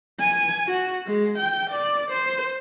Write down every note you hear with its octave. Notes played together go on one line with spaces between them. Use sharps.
G#5
F#4
G#3
G5
D5
C5